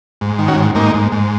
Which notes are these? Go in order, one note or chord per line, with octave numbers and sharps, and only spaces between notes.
G#2
D#3
C#4 F#4
G#2
G#2 A#3 D#4
G#2
G#2